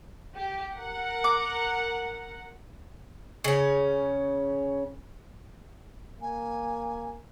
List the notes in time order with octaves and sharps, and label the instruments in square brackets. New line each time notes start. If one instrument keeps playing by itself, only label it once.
[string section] G4
A#4 F#5
[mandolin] D6
[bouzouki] C#3 C#4
[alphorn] A#3 [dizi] G#5